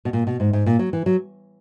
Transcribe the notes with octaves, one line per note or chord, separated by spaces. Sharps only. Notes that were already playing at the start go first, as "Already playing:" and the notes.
B2
A#2
B2
G#2
G#2
A#2
F#3
E3
F#3